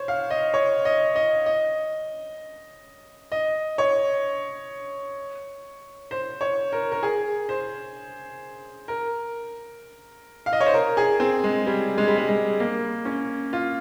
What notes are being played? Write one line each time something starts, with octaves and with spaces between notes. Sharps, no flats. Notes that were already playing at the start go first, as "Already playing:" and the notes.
Already playing: C5 C#5
F5
D#5
C#5
D#5
D#5
D#5
D#5
C#5
C5
C#5
A#4
A#4
G#4
C5
A#4
F5
D#5
C#5
C5
A#4
G#4
C4
G#3
G3
G#3
G3
G#3
G#3
A#3
C#4
F4